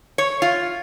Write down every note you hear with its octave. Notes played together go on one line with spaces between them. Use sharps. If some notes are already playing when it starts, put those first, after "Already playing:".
C#5
F4